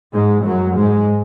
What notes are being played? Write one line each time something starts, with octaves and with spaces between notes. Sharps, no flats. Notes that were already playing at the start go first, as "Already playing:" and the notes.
G#2 G#3
F#2 F#3
G#2 G#3